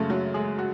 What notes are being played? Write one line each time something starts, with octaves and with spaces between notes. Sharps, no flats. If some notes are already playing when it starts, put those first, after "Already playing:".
Already playing: F#2 C#3 G#3 A3 A4
F#3 F#4
G#3 G#4
F#4